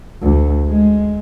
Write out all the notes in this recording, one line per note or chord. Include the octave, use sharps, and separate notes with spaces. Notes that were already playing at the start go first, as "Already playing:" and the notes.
D2
G#3